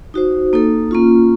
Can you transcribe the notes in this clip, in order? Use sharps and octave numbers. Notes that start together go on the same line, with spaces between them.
D#4 F#4 C5
A#3 D#4 A4
A#3 C#4 F4